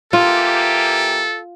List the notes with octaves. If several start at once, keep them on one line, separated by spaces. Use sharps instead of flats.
E3 A#3 F4 G4 A4